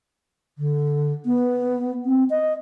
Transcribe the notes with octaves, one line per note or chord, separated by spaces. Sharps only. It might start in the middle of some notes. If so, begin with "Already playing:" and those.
D3
B3
C4
D#5